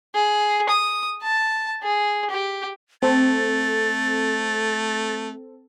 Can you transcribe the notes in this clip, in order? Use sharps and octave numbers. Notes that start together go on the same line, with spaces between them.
G#4
D#6
A5
G#4
G4
A3 C4 A4 A6